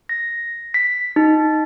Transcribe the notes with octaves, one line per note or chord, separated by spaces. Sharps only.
A#6
B6
D#4